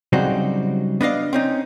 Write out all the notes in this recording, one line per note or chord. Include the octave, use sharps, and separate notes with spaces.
C#3 F#3 G3 C4 D#4 F#4
B3 D4 D#5 F5
C4 C#4 D#4